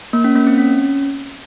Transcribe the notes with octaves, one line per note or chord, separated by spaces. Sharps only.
A#3
C#4
A#3
C4
C#4